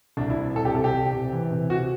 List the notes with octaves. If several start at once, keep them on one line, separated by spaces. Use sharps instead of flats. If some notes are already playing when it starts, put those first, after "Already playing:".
C2 D4
E4
C3
C2 A4
G4
C3 A4
G4
C3
C3
E3
C3
C3 F#4